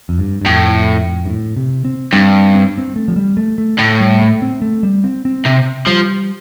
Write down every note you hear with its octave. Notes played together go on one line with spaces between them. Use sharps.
F2
G2
G2
F2 A2
G2
A2
C3
C4
G2 C4
C4
C4
A3
F3
G3
A3
A3
A2 A3
G3
A3
C4
A3
G3
C4
C4
C3
F3 G3